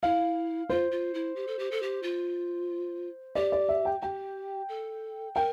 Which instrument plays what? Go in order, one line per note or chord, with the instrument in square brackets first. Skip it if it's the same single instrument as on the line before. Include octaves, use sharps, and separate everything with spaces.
[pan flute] E4 [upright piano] F5
[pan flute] F4 [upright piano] C5
[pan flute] F4
E4
G4
A4
G4
A4
G4
F4
[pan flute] G4 [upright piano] D5
[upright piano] D5
E5
G5
[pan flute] G4 [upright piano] G5
[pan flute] A4
[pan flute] A#4 [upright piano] G5